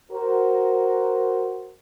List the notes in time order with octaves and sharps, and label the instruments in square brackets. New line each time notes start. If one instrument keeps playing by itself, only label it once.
[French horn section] F#4 A#4 C5